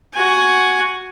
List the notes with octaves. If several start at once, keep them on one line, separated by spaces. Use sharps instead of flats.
F#4 G#5